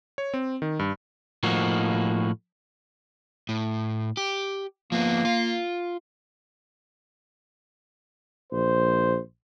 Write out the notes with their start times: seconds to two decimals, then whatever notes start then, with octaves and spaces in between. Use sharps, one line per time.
0.18 C#5
0.34 C4
0.62 D#3
0.79 G2
1.43 A2 F3 A#3 D#4 F#4
3.49 A2
4.17 G4
4.92 F3 A#3 B3
5.25 F4
8.52 A#1 C5